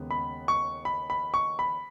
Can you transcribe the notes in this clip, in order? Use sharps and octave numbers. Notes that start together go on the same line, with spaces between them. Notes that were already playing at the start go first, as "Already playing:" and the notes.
Already playing: D#2 C#3 G#3 B3
B5
C#6
B5
B5
C#6
B5